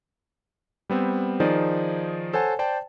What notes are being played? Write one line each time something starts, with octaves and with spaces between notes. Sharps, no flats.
G3 B3 C4
D#3 F3 D#4 G#4 C5 D5
A4 C5 C#5 F#5 G#5 A5
C5 D5 G5 A5